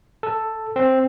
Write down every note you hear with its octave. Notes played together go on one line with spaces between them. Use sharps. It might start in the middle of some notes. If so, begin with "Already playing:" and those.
A4
C4